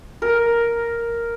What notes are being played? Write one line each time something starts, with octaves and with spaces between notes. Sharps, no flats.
A#4